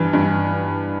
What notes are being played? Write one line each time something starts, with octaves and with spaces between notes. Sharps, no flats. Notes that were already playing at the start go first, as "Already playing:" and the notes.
Already playing: G2 E3
G2